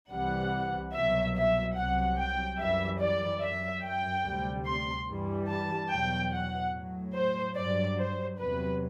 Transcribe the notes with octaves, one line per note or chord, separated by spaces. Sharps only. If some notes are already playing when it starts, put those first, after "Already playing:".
C2 C3 E3 G3 F#5
C2 B2 F#3 E5
E5
C2 C3 F#3 F#5
G5
F#2 E3 G3 E5
D5
F#2 F#3 E5
G5
D2 C3 G3
C6
G2 E3 G3
A5
E2 B2 F#3 G5
F#5
A2 F#3
C5
G2 F#3 D5
C5
E2 C3 F#3 B4